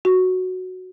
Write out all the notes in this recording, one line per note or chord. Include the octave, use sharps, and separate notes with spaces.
F#4